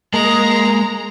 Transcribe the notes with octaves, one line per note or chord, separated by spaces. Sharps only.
G#3 A#3 A#5